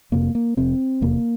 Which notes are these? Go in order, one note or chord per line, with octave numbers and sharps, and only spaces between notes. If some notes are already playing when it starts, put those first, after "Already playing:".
F1 F2 C3 A#3
A#3
F1 F2 C3 C4
F1 E2 C3 A#3